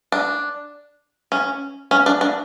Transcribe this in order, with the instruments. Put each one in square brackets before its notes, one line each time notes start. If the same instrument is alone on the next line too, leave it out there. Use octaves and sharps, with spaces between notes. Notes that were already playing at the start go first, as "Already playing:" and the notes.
[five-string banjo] D4
C#4
C#4
D4
D4